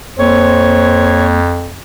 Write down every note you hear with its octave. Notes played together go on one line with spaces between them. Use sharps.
F2 A#3 C5 C#5